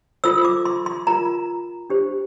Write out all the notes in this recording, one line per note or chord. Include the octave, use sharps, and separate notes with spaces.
F4 A4 C5 E6
D6
C6
C6
F4 A#4 A#5
D4 G4 C5